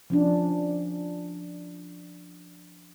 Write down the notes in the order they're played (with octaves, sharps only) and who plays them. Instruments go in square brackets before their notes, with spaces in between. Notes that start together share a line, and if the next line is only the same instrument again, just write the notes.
[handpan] F3 C#4 D4